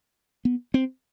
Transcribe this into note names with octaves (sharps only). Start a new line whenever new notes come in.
B3
C4